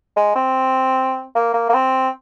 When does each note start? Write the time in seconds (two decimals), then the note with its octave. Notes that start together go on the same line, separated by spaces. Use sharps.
0.16 G#3
0.36 C4
1.35 A#3
1.54 A#3
1.69 A#3
1.74 C4